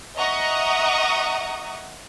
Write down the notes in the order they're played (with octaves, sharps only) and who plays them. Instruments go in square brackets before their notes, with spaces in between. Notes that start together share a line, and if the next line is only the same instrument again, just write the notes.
[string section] D#5 E5 F#5 A#5 C#6 D#6